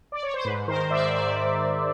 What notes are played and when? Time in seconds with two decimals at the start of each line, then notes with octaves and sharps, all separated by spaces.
0.12 D5
0.23 C#5
0.34 C5
0.44 G#2 B4
0.68 D#3 A#4 C5
0.90 G#2 D5 E5
1.13 D#3 D5 E5